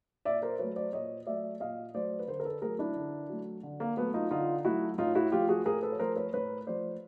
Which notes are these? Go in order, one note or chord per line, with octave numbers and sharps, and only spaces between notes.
A#2 D5 E5
A#4 C5
F#3 A3 B4 C#5
C5 D5
A#2 C#5 D#5
F#3 A3 D5 E5
A#2 D#5 F5
F#3 A3 C5 D5
B4
D3 A#4 C5
A#4
A4 B4
F#3 A3 G#4 A#4
D4 E4
D3
F#3 A3
D3
A#3
F#3 A3 B3
D#4 F4
D3 D#4 F4
F#3 A3 E4 F#4
A2 D#4 F4
E4 F#4
F3 A3 F4 G4
F#4 G#4
A2 G#4 A#4
A4 B4
C#5
F3 A3 A#4 C5
B4 C#5
A2 B4 C#5
F3 A3 C5 D5